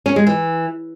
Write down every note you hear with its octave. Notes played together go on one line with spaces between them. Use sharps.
C#4
G#3
E3